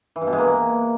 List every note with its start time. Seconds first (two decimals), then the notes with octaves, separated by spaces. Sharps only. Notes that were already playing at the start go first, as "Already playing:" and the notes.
0.16 E3
0.21 G2
0.27 B2
0.33 G#3
0.38 A#3